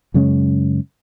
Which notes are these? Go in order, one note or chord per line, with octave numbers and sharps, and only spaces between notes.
F#2 C#3 G#3 C#4